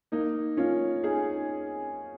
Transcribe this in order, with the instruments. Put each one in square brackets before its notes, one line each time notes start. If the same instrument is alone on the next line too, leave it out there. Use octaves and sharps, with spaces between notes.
[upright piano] A#3 D#4
C#4 F4
D#4 G#4